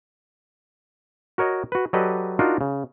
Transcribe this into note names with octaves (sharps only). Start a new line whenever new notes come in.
F#4 A#4 C#5 D#5
F#4 B4
F#3 G4 A4 B4 D5 D#5
D4 D#4 F4 F#4 A#4
C#3